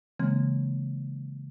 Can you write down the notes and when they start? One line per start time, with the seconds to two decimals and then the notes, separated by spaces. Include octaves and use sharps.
0.19 C#3 E3 G#3 A#3 C4